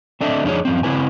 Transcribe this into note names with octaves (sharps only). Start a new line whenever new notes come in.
C4 D4 A4 D#5 E5
F2 D4 D#4 F#4 G#4 C#5
F#2 F3 C4
C#3 C4 E4 B4 G#5